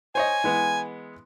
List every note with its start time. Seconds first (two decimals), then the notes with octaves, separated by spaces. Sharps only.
0.15 C5 C#5 D#5 G#5
0.44 E3 G#3 B3